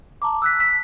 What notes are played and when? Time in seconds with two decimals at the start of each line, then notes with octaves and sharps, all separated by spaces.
0.22 A5 A#5 D6
0.42 E6 F#6 B6
0.60 B6